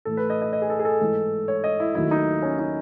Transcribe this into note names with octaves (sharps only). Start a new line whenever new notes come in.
A2 E3 A3 A4
B4
D#5
D#5
D#5
G#4
A4
G#4
A4
G#2 E3 A3
C#5
D#5
E4
D#2 D#3 F#3 A3 E4
D#4
C#4
D#4